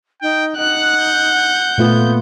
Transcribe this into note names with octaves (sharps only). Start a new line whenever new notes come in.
D#4 G5
D#4 F#5 F#6
G6
A#2 A3 B3 F4